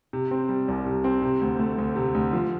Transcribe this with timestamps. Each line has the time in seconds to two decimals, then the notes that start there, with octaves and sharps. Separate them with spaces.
0.13 C3
0.31 C4
0.49 G3
0.68 C2
0.86 C3
1.04 C4
1.22 C3
1.41 D2
1.59 A3
1.78 D2
1.95 C3
2.14 D2
2.33 F3